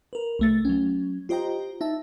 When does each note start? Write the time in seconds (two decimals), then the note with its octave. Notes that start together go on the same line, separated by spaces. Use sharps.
0.13 A#4 B4
0.39 C2 A3 A6
0.65 F#3 C#4
1.29 F4 G4 C5 D#5 G5 A#5
1.81 D#4 E5 A5